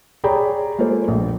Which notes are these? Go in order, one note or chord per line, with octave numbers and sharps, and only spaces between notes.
G#4 C#5 D5 G5 A#5 B5
G#3 A#3 F4 A4 C5
A#1